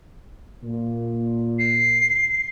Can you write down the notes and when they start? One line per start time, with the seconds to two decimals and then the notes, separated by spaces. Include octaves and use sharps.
0.63 A#2
1.59 C7